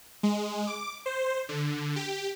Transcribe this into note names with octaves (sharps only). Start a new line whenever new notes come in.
G#3
D6
C5
D3
G4